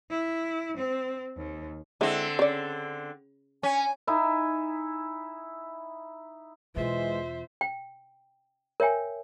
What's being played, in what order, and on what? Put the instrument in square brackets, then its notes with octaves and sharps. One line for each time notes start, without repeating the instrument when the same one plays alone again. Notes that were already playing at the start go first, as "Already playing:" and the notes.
[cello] E4
C4
D#2
[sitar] D3 C4 [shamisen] G#3 E4
[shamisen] C#3 D5
[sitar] C#4 [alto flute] G#5
[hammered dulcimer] D#4 E4 G#5
[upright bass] E2 B2 [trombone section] E3 G#3 [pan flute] F4 [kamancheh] C5 E5
[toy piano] G5
A#4 C#5 E5 G5 G#5